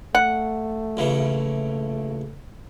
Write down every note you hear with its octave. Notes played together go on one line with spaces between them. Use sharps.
A3 F#5
A#1 C#3 E3